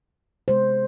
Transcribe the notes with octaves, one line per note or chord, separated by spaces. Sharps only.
C3 G#3 B3 C5